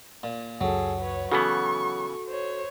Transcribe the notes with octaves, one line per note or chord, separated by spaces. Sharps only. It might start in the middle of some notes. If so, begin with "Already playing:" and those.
A#2
C#2 F#2 F#3 G#4 A4
B4 C#5
C#3 E3 B3 F#4 A4 C#6
C5 C#5